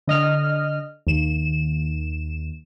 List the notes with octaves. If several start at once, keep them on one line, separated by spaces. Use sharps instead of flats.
D3 D#5 F6
D#2 E7